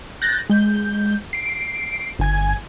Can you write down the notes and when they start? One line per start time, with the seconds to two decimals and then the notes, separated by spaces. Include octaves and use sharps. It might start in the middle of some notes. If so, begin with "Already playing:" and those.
0.22 F#6 G6 A6 A#6
0.50 G#3 G6
1.33 C7 D7
2.19 G1 G#5 G#6